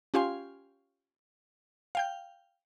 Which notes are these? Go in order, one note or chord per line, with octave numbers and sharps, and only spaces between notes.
C#4 F4 G4 F5 G#5 C6
F5 G5 G6